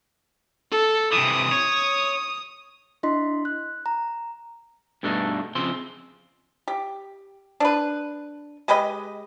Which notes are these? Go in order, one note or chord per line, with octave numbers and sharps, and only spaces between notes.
A4
C3 E3 D#6
C#5
D4 E4 D#5 C6 B6
F#6
A#5
G2 B2 A3 B3 D4 D#4
C#3 F3 C4 C6
G4
D4 B4
G#3 G4 B4 D#5